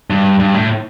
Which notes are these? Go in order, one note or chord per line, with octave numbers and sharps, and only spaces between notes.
G2
G2
A2